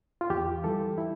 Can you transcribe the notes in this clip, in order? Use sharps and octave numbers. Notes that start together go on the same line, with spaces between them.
F4
E2 G4
E3 G3 A4
E4